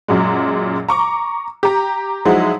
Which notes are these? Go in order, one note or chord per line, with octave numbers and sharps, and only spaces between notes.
F#2 A#2 F#3 G#3
A#5 C#6 D6
G4 A#5
F3 F#3 G#3 D#4 E4 F#4